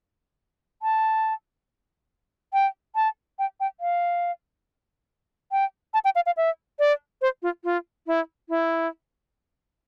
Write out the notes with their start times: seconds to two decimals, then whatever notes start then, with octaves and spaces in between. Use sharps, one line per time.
0.82 A5
2.53 G5
2.95 A5
3.39 G5
3.60 G5
3.80 F5
5.52 G5
5.94 A5
6.04 G5
6.15 F5
6.26 F5
6.37 E5
6.79 D5
7.22 C5
7.42 F4
7.64 F4
8.07 E4
8.49 E4